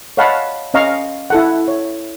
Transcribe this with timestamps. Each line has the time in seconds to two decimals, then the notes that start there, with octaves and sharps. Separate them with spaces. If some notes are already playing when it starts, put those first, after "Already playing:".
0.17 C#5 D#5 F5 F#5 A5 B5
0.74 C#4 D#5 F5 A#5 C#6
1.30 E4 A4 F#5
1.68 C#5